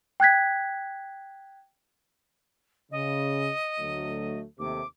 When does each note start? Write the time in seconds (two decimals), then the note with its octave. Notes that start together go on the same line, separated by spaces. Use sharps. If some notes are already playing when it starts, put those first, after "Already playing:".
0.20 G5 F#6 G#6 B6
2.92 C#3 D#5
3.79 D2 F#3 A3
4.59 D#2 C3 A3 D6